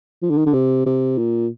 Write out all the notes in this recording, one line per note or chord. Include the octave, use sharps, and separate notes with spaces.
F3
D3
D#3
D3
C3
C3
A#2